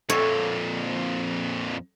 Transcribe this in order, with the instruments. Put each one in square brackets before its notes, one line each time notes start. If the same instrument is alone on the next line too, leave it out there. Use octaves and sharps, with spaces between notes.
[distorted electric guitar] F2 A#2 [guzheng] A4 C#5 E5